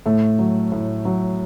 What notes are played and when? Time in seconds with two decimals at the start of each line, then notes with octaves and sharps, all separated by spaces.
0.06 A2 A3
0.39 F#3
0.72 A2
1.05 F#3